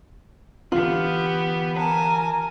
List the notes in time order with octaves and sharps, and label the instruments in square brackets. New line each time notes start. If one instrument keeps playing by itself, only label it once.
[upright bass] D3 E3 [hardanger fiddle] B3 G4 [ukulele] F4
[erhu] A#4 [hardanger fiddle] G#5 A5